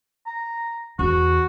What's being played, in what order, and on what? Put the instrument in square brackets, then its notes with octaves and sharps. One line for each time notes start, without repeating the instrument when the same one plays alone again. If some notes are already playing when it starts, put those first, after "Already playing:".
[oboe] A#5
[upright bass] E2 [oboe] F#4